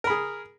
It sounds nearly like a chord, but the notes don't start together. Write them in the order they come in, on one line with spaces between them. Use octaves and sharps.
A#4 B5 G#4